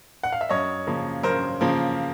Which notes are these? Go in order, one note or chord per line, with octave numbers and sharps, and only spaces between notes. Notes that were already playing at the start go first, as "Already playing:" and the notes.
F#5
F5
E5
F#2 C#5 D#5
C#3 F3 A#3
F#2 A#4 C5
C#3 F3 A#3